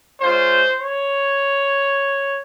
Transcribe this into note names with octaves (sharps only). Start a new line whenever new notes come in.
G#3 C#4 F4 C5
C#5